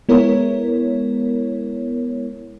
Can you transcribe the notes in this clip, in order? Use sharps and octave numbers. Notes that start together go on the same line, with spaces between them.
G#3 B3 E4 A#4 C#5